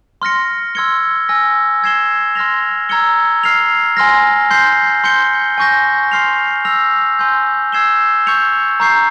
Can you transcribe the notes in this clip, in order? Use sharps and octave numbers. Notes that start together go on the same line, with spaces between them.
C6 F6 A#6 C#7
C6 E6 G#6 C#7 G7
G#5 E6 A#6
E6 G#6 C7 E7 G7
C6 F6 A#6 F7
A#5 E6 G#6 C#7 G7
F6 C7 F7
G#5 C6 F6 A#6
C6 G6 C7
C6 G6 C#7 G7
G#5 C#6 G6 A#6
C6 F6 C7 F7
E6 A#6 F7
G#5 C6 G6
E6 G#6 C7 E7 G7
C#6 G6 C#7 F7
A#5 C#6 G6 C7